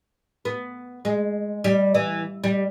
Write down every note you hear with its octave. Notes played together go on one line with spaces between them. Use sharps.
B3
G#3
G3
E3
G3